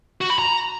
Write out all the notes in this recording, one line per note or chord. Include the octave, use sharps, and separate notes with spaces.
F#4
B5
A#5